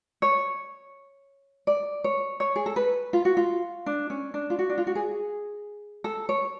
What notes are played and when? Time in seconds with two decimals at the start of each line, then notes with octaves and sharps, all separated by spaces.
0.22 C#5
1.67 D5
2.04 C#5
2.40 C#5
2.56 G#4
2.66 A4
2.76 B4
3.13 F4
3.25 F#4
3.37 F4
3.86 D4
4.10 C#4
4.34 D4
4.50 F4
4.59 F#4
4.70 D4
4.78 F4
4.87 F#4
4.95 G#4
6.04 A4
6.29 C#5